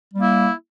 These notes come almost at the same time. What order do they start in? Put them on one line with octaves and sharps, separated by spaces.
G3 A#3 E4